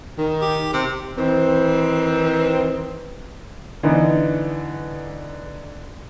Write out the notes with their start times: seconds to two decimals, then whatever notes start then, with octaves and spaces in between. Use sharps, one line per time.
0.18 D#3
0.41 G4
0.73 C3
1.17 D#3 E3 C4
3.83 D3 E3 B3 D#4